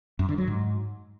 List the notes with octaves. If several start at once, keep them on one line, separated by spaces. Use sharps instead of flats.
F#2
D3
F#3
G#2